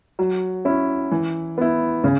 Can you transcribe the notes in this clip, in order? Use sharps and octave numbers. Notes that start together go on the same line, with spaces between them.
F#3
C#4 E4
E3
B3 E4
C#3